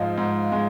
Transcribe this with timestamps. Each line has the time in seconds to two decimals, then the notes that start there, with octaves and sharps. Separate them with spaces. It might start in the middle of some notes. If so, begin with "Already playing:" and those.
Already playing: G#2 F3 G#3 D#5 F5
0.18 G#2
0.52 G#3